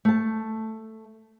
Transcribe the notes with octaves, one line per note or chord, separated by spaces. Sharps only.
A3 A5